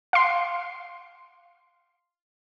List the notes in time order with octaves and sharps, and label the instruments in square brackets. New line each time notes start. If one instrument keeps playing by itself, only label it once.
[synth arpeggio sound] F5 C6